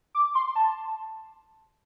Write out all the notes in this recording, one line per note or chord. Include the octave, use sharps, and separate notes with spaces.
D6
C6
A5